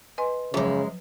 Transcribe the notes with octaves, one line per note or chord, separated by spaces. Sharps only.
B4 D#5 G#5 C6
F#2 C#3 F3 F#3 G#3